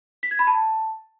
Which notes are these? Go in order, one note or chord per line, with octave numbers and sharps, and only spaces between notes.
B6
G#6
B5
A5